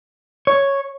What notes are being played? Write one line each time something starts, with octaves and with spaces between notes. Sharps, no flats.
C#5